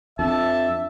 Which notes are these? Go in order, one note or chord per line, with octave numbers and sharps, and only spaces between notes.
F2 D4 E5 A5